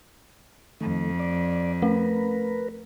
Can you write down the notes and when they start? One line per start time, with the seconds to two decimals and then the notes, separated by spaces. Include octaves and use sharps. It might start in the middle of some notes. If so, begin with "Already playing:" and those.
0.81 F2 D#3 A3
1.19 D5
1.82 A3 A#4 B4